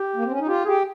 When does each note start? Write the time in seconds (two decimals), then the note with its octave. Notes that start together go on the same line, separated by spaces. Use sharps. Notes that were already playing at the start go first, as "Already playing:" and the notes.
Already playing: G4
0.16 A#3
0.24 C4
0.31 C#4
0.39 D#4
0.47 F4 G4
0.65 G4 G#4